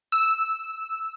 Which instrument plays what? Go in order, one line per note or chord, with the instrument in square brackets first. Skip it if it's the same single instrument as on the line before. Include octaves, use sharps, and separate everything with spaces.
[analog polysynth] E6